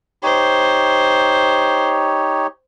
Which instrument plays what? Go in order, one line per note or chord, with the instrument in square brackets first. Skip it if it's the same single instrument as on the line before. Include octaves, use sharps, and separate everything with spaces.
[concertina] D#4 G4 C#5 [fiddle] C5